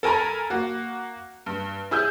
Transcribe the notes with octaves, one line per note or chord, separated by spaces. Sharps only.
A4 A#4 G#5 A#5 B5
A#3 F#4
G2
E4 G#4 E6 G6